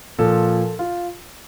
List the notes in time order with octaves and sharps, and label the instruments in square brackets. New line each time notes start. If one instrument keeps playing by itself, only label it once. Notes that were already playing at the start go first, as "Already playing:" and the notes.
[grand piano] A#2 F3 A4
F4